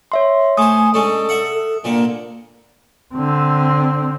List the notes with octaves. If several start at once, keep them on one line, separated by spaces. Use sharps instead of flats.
C#5 E5 C6
A3 C5 G#5 D#6
G#3 C#4 D4 A4
E5 F#5
A4
A#2 D3 A#3 C4
D3 C4